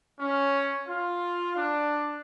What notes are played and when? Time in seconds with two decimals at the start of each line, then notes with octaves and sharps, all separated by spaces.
0.20 C#4
0.88 F4
1.55 D4